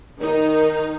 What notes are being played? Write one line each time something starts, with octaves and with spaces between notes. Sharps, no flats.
D#3 D#4